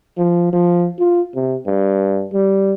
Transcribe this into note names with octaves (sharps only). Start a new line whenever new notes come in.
F3
F3
F4
C3
G2
G3